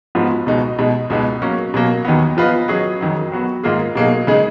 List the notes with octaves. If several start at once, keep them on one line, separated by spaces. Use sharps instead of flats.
G#2 F3 B3 F#4
C#2 B2 G#3 D#4 F#4
B2 G#3 D#4
C#2 B2 G#3 B3 D#4
F#3 A#3 C#4
B2 F#3 A#3
D#2 D#3 F#3 B3
F3 B3 F4 B4 D#5
F#3 C#4 G#4 D#5
F2 D#3 F#3
F#3 B3 F#4
G#2 D#3 A#3 F4 G#4
B2 F#3 A#3 D#4 G#4
C#3 G#3 D#4 G#4